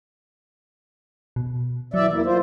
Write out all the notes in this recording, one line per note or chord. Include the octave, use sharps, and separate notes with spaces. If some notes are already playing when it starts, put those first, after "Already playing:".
B2
E3 F#3 D5 E5
E2 A#3 E4
F4 C5